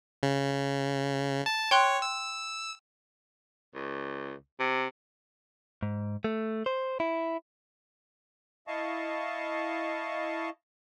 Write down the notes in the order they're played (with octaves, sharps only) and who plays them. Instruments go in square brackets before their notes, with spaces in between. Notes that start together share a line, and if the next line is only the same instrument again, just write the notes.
[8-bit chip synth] C#3
A5
[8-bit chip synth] C#5 [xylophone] G5 C6 F#6
[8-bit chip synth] E6
[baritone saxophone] C#2
C3
[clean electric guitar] G#2
A3
C5
E4
[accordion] E4 D#5 F5 A5 C#6